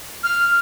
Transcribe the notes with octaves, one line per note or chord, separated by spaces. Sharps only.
F6